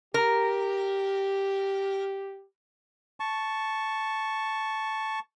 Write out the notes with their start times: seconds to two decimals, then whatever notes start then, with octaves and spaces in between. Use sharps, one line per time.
0.14 G4 A#4
3.20 A5 C#6